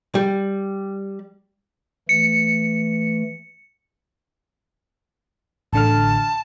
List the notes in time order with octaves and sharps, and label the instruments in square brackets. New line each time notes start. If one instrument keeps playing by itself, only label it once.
[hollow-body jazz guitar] G3
[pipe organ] E3 A3 [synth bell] C#7
[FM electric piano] A1 D3 F6 [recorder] A5